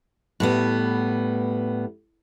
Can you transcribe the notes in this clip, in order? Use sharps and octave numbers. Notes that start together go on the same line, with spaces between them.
A2 G3 B3